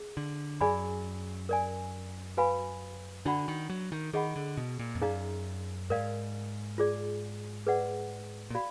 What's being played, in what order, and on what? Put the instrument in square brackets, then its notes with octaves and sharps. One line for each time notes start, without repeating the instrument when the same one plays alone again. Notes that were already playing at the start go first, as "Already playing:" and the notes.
Already playing: [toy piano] G#4
[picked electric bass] D3
[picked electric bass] F#2 [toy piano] G#4 D5 G#5 B5
[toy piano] A#4 D5 G#5
F#4 B4 F5 G#5 B5
[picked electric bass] D3 [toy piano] D4 F#4 D5 F#5 B5
[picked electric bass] D#3
F#3
D#3
[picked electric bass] D#3 [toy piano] G#4 D#5 F#5 B5
[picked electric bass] D3
B2
A#2
F2
[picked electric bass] F#2 [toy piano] D#4 G#4 D5 F5 A#5
[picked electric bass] G#2 [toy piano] A#4 D5 F5
[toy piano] F4 G#4 D5
G#4 B4 D5 F#5
[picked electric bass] A#2
[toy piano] F#4 D5 F5 B5